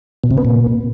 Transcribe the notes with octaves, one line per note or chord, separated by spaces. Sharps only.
B2
C3
B3
A#2